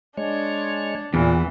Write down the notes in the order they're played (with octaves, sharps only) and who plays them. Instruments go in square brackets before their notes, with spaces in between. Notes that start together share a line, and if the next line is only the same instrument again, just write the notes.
[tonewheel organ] G#3 C#5 [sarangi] D4
[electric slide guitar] E2 [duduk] A#2 [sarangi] E3 [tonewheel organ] B3